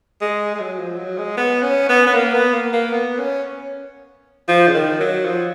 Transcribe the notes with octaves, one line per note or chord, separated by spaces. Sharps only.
G#3
G#3
F#3
F3
F#3
G#3
B3
C#4
B3
B3
A#3
B3
A#3
A#3
B3
C#4
F3
C#3
D#3
F#3
F3